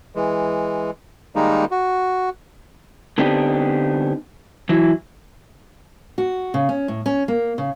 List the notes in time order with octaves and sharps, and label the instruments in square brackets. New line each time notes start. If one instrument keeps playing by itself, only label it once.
[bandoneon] E3 G#3
D#3 G3 G#3 A#3 D#4
F#4
[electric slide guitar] D3 B3 C4 D4 D#4 G4
E3 F#3 E4
[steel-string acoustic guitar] F#4
C#3
C#4
A2
C#4
A#3
C#3